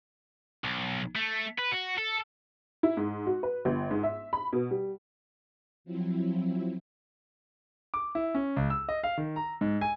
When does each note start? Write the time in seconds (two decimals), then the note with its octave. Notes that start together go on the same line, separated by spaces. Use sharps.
0.64 B1
1.15 A3
1.58 B4
1.72 F#4
1.98 A4
2.83 E4
2.97 G#2
3.26 F#4
3.43 B4
3.65 G1
3.91 G#2
4.03 E5
4.33 B5
4.53 B2
4.71 G3
5.85 F3 F#3 C4 E4
7.94 D6
8.15 E4
8.35 C#4
8.56 C#2
8.70 E6
8.89 D#5
9.03 F5
9.17 D#3
9.36 A#5
9.61 G#2
9.81 G#5